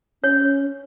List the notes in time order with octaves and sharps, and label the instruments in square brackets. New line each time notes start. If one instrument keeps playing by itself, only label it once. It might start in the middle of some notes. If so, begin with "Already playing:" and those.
[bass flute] C#4 [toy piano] C#5